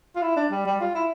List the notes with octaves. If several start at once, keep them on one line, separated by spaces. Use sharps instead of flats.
F4
E4
D4
G3
G3
F4
E4